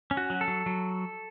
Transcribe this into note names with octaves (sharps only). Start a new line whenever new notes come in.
C#4
F#4
F#3
A4
F#3
F#3